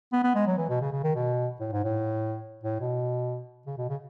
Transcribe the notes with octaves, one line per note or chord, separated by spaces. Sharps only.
B3
B3
G#3
F#3
E3
B2
C#3
C#3
D#3
B2
A2
G#2
A2
A2
B2
C#3
B2
C#3